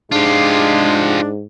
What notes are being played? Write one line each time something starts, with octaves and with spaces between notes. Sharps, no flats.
G#2 G#3 D4 F4 G4